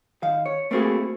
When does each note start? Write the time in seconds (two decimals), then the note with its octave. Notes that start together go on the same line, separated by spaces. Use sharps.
0.22 D#3 F5
0.46 C#5
0.71 A3 A#3 C4 E4 F#4 G#4